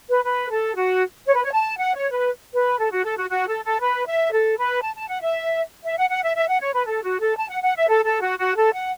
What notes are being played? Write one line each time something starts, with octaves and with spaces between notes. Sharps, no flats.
B4
B4
A4
F#4
C#5
B4
C#5
A5
F#5
C#5
B4
B4
A4
F#4
A4
F#4
F#4
A4
A4
B4
E5
A4
B4
A5
A5
F#5
E5
E5
F#5
F#5
E5
E5
F#5
C#5
B4
A4
F#4
A4
A5
F#5
F#5
E5
A4
A4
F#4
F#4
A4
F#5